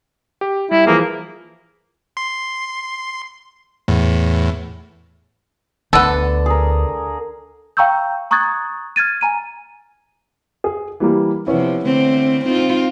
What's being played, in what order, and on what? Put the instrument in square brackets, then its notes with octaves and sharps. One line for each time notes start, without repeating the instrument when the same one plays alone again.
[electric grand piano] G4
[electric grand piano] G3 [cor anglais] E4
[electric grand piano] E3 F3 G#4 [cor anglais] A#3
[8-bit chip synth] C6
E2 A2
[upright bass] D2 [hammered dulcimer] D3 [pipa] B3 A4
[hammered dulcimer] G#4 A#4
[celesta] F5 G5 A#5 C#6 E6 G6
A#5 C#6 D#6 F#6 G#6 A6
F6 G#6 A6 D#7
G#5 A#5 D#7
[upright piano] G#4
E3 G3 A#3
[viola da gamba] C3 F3 [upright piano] B3 C#4 E4
[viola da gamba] D3 A3 C4
C4 D#4 F4